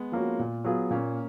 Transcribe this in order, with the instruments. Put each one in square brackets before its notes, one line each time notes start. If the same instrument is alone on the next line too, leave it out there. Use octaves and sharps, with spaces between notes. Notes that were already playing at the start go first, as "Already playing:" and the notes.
Already playing: [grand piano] G#3 B3
[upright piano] F3 A#3 C#4 F#4
A#2
F#3 B3 F4 G#4
[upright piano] A#2 [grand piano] A#3 C#4